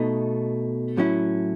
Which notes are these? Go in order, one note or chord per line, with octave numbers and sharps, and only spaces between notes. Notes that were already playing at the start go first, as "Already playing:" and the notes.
Already playing: B2 A3 D#4
A2 F#3 C#4 E4